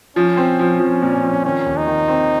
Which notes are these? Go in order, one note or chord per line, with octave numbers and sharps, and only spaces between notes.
F3 C#4
C4
F3
F3
A#2
F3
D#3 C#4
D#2
D#4
D#3
C4